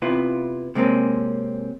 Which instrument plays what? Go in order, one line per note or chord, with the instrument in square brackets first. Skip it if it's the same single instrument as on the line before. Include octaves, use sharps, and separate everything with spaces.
[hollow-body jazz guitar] C3 B3 E4 F4
C3 G#3 A#3 C4 C#4